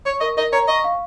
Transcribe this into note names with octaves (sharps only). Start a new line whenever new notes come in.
C#5 C#6
A#4 D#5
A#4 D#5
C#5 A#5
D#5 C#6
F5